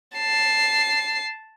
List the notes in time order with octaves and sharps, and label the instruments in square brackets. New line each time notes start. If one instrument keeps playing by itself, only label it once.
[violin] A5 C7